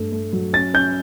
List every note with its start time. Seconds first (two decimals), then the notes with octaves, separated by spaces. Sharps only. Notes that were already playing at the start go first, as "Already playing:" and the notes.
Already playing: G2 A3
0.12 A3
0.33 F#3
0.53 C#4 A6
0.74 C#4 G6